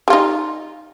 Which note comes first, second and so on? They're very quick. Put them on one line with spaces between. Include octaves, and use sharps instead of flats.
G3 F4 D#4